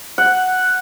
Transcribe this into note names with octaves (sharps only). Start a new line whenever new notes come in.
F#5